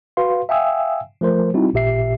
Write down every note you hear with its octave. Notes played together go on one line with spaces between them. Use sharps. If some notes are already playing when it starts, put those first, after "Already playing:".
F#4 B4 F5 C6
E5 F5 G5 G#5 D#6 E6
F3 A3 A#4 C5
G3 C4 D#4 E4 F#4
A1 A#2 G4 E5 C7